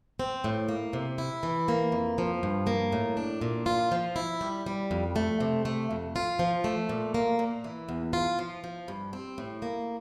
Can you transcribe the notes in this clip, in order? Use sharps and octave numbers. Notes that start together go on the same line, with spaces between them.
C4
A2
A#3
C3
E4
E3
A#3
F2
F3
G2
A#3
A2
D4
A#2
F4
F3
E4
G3
G3
F2
A3
C3
A3
F2
F4
F3
A3
A#2
A#3
A#2
E3
E2
F4
F3
F3
G2
C4
A2
A#3